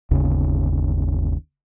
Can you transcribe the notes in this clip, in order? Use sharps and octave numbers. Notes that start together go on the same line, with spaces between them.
G1 D#2 C#3